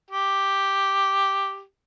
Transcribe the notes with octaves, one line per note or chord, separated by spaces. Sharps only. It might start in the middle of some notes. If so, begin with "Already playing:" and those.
G4